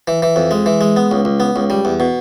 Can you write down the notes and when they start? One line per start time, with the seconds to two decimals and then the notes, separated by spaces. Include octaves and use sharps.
0.08 E3
0.23 E3
0.36 F2
0.51 G#3
0.66 E3
0.81 G#3
0.97 B3
1.11 C#2
1.25 C#2
1.40 B3
1.56 C#2
1.70 G3
1.85 E2
2.00 B2